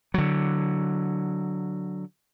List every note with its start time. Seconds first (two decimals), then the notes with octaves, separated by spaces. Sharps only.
0.14 D3 F#3